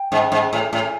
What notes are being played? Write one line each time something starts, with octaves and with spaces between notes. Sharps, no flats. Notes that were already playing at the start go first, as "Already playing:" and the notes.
Already playing: G5
G#2
G#2
A2 G#5
A2